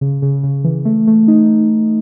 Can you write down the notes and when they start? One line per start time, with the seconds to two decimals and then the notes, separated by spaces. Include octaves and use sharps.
0.01 C#3
0.22 C#3
0.43 C#3
0.64 E3
0.85 A3
1.07 A3
1.28 D#4